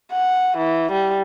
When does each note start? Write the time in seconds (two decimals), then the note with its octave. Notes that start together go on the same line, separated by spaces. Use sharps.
0.12 F#5
0.58 E3
0.92 G3